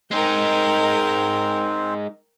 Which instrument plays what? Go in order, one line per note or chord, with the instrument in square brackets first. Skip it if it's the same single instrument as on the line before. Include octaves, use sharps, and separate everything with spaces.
[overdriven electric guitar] G#3 D#4 [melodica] C4 [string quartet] A#4 G5